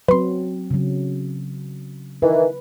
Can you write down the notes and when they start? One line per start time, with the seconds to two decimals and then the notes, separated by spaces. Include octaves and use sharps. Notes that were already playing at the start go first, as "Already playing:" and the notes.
0.08 F#3 C4 B4 C6
0.71 C#3 F#3
2.22 D#3 E3 B4